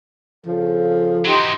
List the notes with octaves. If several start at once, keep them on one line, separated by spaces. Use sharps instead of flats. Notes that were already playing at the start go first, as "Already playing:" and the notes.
F2 C#3 F3 A4
E3 F#3 D#4 G4 C6